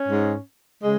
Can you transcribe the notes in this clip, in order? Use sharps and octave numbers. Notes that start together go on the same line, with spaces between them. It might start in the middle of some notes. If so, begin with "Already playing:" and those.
Already playing: C#4
G#2 G#3
C#3 G#3